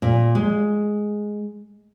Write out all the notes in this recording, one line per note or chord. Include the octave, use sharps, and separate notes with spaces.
A#2
G#3